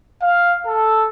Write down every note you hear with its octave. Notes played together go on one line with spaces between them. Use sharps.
F5
A4